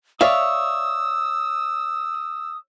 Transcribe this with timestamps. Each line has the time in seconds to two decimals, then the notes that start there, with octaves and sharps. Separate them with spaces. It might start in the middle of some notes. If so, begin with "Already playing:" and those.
0.21 C#5 D5 E5 F5 D#6 E6